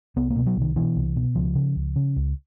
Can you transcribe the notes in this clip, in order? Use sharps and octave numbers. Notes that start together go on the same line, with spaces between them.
C2 B3
A#3
B2
F#3
C2
D#3
B2 E3
C2
B2
C#2 F3
C#3
C#2
C#3
C#2